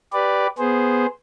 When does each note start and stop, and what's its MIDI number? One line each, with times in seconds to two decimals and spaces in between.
0.13 0.47 67
0.13 0.47 71
0.13 0.47 74
0.58 1.06 59
0.58 1.06 68
0.58 1.06 72